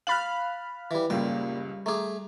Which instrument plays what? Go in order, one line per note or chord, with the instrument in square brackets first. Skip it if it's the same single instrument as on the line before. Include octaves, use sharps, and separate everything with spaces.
[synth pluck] F5 B5 F6 [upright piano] F#6 A6 F#7
[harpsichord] E3 G3
[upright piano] F#1 C#2 C#3 [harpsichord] A#2 G5 [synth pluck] G3
[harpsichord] A3 G#4 [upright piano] A#5 D6